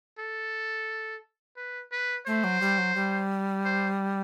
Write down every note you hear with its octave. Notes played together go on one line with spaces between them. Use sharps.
A4
B4
B4
A3 C5
F#3
G3
F#3
G3
C5